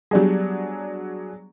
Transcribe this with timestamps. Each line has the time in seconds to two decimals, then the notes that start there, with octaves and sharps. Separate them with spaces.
0.11 F#3 G3 B3 D4 G4 G#4